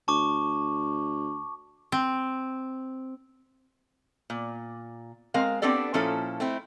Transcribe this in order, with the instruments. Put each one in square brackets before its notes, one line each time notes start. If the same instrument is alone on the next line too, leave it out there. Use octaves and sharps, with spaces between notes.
[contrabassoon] D2 [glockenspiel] A5 C#6 D6
[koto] C4
[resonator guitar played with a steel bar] A#2
G#3 C4 A#4 F5
B3 C4 D4 G4 A4 D5
A#2 F3 C#4 E4 A4
A3 C4 E4